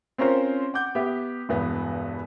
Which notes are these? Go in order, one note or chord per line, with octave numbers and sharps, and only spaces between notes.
C4 C#4 F4 A#4 C5
F#5 D6 G6
B3 G4 E5
E1 E2 G2 B3